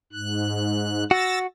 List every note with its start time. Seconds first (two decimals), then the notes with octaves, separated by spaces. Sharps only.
0.13 G#2 F#6
1.11 F#4 E6 A6 A#6